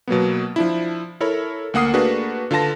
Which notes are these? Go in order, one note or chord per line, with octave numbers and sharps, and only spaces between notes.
B2 F#3 A#3 B3
F3 D4 E4
E4 A4 A#4 C#5 B5
D2 A#3 F#5 D#6 C7
A3 A#3 D4 F#4 G#4 B4
D3 F4 B4 A5 A#6